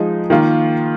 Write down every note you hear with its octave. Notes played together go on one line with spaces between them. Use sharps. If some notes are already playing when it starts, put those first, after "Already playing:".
Already playing: F3 G#3 D#4
D#3 A#3 F4